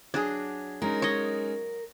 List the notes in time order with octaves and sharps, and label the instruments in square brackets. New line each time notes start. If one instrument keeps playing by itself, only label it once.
[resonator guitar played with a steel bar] F#3 G#4 [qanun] D4 [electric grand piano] G#6
[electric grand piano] G#3 C#4 D#4 [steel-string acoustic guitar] A#4
[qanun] C#5 D#5